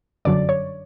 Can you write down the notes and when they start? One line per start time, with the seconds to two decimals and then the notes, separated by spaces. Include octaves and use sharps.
0.25 G1 F#2 D3 F#3 D5
0.49 C#5